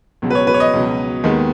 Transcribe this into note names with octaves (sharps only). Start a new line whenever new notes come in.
C#2 B2 F#3
B4
C#5
B4
C#5
D#5
C#2 B2 F#3
D#2 D#3 G#3 B3